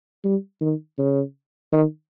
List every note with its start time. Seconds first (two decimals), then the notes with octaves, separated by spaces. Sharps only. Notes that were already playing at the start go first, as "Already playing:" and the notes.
0.24 G3
0.61 D#3
0.98 C#3
1.72 D#3